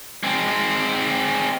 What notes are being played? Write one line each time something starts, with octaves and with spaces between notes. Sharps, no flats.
G#3 C4